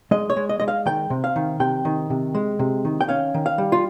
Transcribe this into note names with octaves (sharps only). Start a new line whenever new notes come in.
G#3 D#5
C#5
G#3
D#5
G#3 D#5
F5
D#3 G5
C3
F5
D#3
C3 G5
D#3
C3
G#3
C3
D#3
G5
C#4 F5
D#3
F5
G3
F4